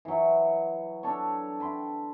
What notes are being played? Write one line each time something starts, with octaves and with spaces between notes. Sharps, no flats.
E3 F#3
D4 A4 C#5
G5 B5 C6